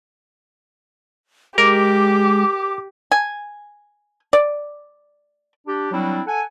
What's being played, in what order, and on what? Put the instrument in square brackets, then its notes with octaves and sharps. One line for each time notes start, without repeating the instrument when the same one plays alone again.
[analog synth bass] G#3 [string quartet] G4 [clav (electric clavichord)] A#4 [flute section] D6
[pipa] G#5
D5
[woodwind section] D4 G4
F#3 G3 C4 D4 E4
A4 F#5 G#5